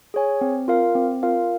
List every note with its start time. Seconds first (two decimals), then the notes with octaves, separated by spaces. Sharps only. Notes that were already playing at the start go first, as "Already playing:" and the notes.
0.14 G#4 C#5 G#5
0.41 C4
0.68 F4 A#4 F5
0.95 C4
1.23 F4 A#4 F5